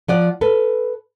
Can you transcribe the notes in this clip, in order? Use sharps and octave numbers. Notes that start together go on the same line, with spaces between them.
F3 D5 F#5
A4 B4